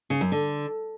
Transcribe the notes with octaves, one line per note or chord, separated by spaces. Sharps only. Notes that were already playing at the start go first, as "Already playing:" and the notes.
C#3
F#2
D3